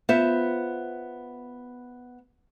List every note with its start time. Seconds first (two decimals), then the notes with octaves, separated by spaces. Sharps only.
0.09 B3 F4 C5 E5